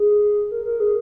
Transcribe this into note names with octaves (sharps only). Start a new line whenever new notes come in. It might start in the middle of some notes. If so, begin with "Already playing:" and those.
Already playing: G#4
A#4
A#4
G#4